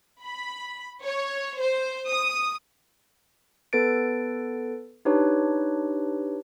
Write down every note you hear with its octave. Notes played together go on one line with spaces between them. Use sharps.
B5
C#5
C5
D#6
B3 A4 B4 A6 D7
D4 D#4 G4 B4 C#5